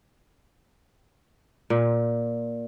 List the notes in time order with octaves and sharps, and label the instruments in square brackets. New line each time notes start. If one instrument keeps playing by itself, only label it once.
[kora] A#2